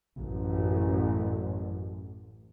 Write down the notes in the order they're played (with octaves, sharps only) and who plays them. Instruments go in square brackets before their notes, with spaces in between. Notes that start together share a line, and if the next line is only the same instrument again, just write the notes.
[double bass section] A1 F#2